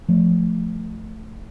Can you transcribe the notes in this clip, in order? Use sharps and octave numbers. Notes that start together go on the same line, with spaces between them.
F3 A3